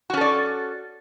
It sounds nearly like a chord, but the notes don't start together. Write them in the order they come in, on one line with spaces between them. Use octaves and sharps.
F#4 C#4 A4 D5